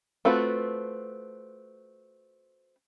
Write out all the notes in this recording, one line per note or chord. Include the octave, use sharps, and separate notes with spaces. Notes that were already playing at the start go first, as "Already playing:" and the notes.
A3 C4 F4 F#4 B4